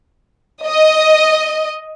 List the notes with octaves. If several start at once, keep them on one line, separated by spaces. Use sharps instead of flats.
D#5